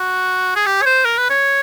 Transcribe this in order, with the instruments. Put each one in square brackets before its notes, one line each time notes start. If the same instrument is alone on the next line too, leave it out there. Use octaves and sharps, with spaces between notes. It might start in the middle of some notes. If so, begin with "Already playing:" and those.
Already playing: [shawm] F#4
G#4
G4
C#5
C5
A#4
B4
C#5